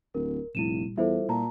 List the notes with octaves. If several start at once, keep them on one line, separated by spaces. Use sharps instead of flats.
D1 A#4
F1 A#2 G3 E4 D#7 E7
E2 G3 E4 F4 A4 C5 E5
A#2 A5 A#5